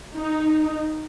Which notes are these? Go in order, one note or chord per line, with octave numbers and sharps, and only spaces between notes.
D#4